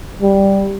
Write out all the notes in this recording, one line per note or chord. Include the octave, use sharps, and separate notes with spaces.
G3